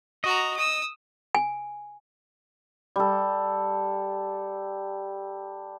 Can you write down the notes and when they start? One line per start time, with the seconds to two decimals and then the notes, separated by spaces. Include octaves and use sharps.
0.24 F#4 D#5 A#5
0.56 D#6 E6
1.35 G#5
2.96 G3 A4